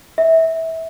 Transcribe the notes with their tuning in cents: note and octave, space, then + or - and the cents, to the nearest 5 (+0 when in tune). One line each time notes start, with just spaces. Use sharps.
E5 -20